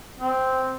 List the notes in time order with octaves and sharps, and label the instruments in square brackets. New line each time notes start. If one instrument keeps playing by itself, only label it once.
[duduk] C4